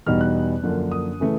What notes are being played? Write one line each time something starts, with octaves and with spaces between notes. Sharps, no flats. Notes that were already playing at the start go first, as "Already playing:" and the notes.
E2 B2 G3 B3 D#4 F6
F#6
F#2 D3 F3 A#3 D4
D#6
C#3 E3 A3 C#4